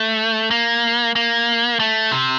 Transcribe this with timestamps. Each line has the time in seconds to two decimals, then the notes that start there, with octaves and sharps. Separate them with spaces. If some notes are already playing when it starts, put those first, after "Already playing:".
Already playing: A3
0.51 A#3
1.15 A#3
1.79 A3
2.12 C3